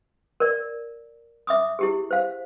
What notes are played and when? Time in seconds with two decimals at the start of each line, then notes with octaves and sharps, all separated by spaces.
0.40 A#4 D5
1.47 E5 D6 D#6
1.79 E4 G4 G#4
2.11 C5 F5